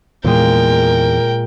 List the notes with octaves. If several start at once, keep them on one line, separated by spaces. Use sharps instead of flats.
E2 A#2 G#3 A#4 G5